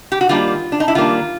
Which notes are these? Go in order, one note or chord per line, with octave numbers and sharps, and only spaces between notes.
G4
F#4
D#3 G3 A#3 D4 F4
D4
D#4
E4
D#3 G3 A#3 D4 F4